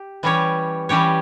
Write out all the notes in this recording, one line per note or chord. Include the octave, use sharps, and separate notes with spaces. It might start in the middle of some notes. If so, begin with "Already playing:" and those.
Already playing: G4
E3 G3 C#4 G4 C#5
E3 G3 C#4 G4 C#5